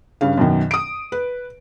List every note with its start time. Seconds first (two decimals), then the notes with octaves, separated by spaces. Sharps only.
0.21 G2 C#3 F5
0.38 F#2 B2 D#3
0.71 D#6 D7
1.12 B4